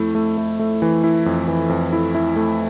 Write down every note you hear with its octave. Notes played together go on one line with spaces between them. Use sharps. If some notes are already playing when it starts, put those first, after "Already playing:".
Already playing: F2 A3 E4
A3
A3
A3
E3
E4
F2
E3
F2
E4
E4
A3